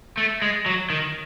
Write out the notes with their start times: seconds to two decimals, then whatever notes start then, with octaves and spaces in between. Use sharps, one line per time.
0.17 A3
0.42 G#3
0.66 F#3
0.90 D#3